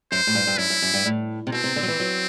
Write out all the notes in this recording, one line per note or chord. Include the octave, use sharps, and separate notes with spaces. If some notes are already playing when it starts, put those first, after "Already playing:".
F#2 C5
A2
G2
G2
F#2 E4
F#2
F#2
G2
A2
C3
B2 C4
C3
D3
F#3
E3
F#3